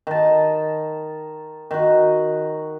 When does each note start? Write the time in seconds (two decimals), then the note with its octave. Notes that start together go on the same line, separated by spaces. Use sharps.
0.07 D#3 A5
1.71 D#3 F#4